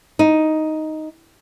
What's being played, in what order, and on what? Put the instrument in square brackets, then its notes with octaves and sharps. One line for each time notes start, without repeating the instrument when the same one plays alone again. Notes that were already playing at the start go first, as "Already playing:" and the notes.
[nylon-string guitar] D#4